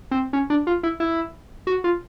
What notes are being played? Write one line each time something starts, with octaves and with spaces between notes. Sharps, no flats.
C4
C#4
D4
F4
E4
E4
F#4
F4